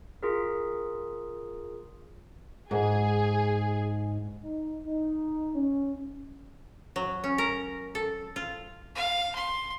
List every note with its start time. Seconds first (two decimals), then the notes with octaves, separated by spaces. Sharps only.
0.23 F4 G#4 A#4
2.71 G#2 G#4
4.43 D#4
4.85 D#4
5.55 C#4
6.96 F#3
7.24 C#4
7.38 A#4
7.95 A4
8.36 F4
8.95 F5
9.35 C6